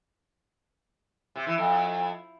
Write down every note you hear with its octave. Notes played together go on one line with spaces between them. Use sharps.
C3
E3
F2